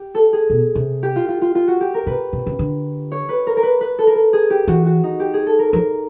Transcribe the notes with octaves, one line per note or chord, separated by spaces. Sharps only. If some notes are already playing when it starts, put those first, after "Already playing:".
Already playing: G4
A4
G#4
B2
C3
G4
F4
F4
F4
F4
F#4
G4
A#4
C3 B4
C3
C#3
D3
C#5
B4
A#4
A#4
B4
B4
A4
A#4
A4
G#4
G4
E3 F#4
F#4
D#4
G4
G#4
A4
A#4
F3 A#4